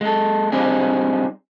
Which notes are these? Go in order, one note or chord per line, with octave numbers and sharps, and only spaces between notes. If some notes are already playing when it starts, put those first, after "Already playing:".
G#3 A4
G3 C4 D4 D#4 G#4